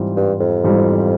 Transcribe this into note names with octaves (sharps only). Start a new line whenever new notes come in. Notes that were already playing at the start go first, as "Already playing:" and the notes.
Already playing: G#2 E3 G3 C4 F4
G2
F2
G#2 E3 G3 C4 F4